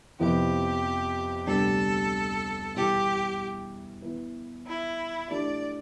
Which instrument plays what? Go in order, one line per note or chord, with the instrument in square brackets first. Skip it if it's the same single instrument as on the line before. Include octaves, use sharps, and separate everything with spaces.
[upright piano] F2 C3 F3 B3 E4 [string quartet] G4
[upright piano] D2 C3 G3 B3 D4 [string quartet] A4
[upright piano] E2 B2 G3 B3 E4 [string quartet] G4
[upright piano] E3 B3 E4 B4
[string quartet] E4
[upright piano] E3 A3 D4 G4 [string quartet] D5